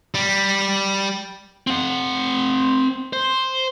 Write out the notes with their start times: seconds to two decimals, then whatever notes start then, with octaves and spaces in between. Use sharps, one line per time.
0.15 G3
1.67 C4 F#5
3.13 C5